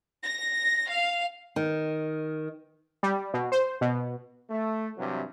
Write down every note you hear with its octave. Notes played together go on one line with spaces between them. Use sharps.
A#6
F5
D#3
G3
B2
C5
B2
A3
G2 C3 E3 F#3